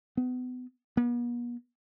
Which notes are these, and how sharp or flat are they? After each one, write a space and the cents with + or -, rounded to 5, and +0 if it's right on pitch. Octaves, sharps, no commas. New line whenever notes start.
B3 +30
B3 -45